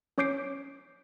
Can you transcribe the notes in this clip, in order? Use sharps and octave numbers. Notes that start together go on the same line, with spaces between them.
C#4 C#5 D6 G6 C7 D7